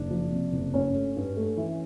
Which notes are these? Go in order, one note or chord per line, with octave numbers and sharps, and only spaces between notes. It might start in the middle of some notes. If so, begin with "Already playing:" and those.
Already playing: F#1 D4
F3
C3
F#1
G2 C#4 C#5
A3
G2
A3
E3